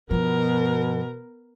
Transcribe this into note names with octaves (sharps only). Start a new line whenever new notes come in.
G2 B2 F3 B3 A#4